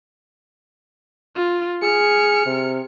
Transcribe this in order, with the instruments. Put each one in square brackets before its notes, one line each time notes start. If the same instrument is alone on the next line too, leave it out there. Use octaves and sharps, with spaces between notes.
[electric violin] F4
[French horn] G#4 [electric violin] F6 C#7
[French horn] C3